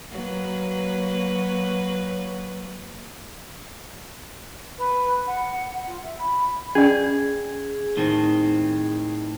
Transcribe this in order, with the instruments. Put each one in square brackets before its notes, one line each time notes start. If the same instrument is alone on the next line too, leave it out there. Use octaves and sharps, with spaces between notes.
[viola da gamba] F#3 A#3 B4
[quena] B4
F#5
F4
E5
B5
[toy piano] C#4 D5 [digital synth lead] G#4
[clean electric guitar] A2 D#3 C4